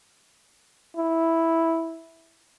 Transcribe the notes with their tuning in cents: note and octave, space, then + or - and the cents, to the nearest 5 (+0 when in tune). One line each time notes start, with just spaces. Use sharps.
E4 -5